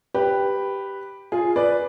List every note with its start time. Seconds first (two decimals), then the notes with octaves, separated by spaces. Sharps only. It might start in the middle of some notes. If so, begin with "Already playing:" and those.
0.14 G4 B4
1.32 F4 G#4
1.56 B4 D5